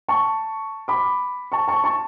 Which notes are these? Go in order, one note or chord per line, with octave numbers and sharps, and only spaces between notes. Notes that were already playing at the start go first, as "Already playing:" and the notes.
A5 C#6
B5 D6
A5 C#6
A5 C#6
A5 C#6